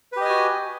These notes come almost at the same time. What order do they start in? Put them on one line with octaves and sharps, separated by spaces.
B4 G4 D#5 G#5 F#4